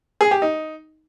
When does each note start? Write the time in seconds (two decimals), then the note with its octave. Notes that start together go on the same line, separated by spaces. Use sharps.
0.21 G#4
0.31 G4
0.42 D#4